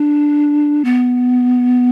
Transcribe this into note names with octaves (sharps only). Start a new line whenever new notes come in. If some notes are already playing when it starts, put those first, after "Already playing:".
Already playing: D4
B3